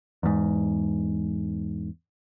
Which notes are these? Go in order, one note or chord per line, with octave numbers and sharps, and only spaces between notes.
E2 G#2